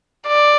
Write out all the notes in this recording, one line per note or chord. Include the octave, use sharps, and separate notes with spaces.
D5